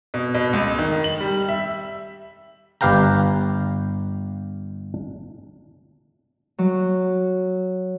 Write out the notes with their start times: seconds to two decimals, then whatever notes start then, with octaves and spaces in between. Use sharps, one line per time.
0.14 B2
0.34 B2
0.53 C#2
0.79 D#3
1.04 F#7
1.20 G3
1.49 E5
2.81 G1 G4 B4 F5 G5 A#5
6.59 F#3